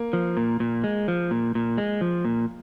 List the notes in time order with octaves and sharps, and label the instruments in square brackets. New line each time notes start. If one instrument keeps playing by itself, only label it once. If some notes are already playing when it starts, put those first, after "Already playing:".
Already playing: [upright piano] A#3
[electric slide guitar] F3
A#2
A#2
G#3
F3
A#2
A#2
G#3
F3
A#2